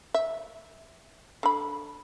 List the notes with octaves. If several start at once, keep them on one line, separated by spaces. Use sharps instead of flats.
E5
D3 B5